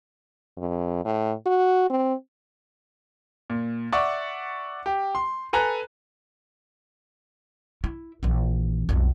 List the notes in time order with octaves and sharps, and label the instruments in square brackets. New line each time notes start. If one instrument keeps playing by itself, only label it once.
[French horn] F2
A2
F#4
C4
[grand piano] A#2
D5 E5 F#5 C#6
G4
C6
A4 B4 G#5 A#5 F#6
[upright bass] E4
A#1 E3
B1 F2